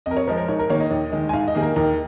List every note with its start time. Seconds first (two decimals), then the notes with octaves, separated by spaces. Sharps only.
0.06 F2 D#5
0.11 A#4
0.17 C#5
0.27 F3 G#3 A#4
0.38 A#4
0.48 G#2 C#5
0.59 A#4
0.70 D#3 A#3 C#5
0.80 D#5
0.91 D#2
1.12 D#3 G#3
1.29 G#5
1.33 G#2 F5
1.48 D#5
1.55 D#3 A#3 G#4
1.62 A#4
1.76 D#2 A#4